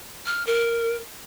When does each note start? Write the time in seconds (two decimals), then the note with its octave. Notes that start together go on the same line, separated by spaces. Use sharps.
0.26 F6
0.47 A#4